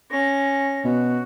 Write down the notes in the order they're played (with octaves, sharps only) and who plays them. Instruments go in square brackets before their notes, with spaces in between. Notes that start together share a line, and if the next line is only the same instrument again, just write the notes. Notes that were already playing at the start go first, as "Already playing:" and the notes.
[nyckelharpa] C#4 [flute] A#6
[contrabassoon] B2 [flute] F#4